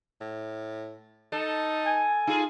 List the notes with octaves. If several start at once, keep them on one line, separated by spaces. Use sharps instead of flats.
A2
D#4 A4
G#5
D#4 F4 G#4